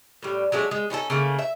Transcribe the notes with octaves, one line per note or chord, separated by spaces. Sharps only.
A2 G3
F#3 G#3 A3 D4
G#3
C#4 D#4 F4 A4
C#3 A3 A#3
E5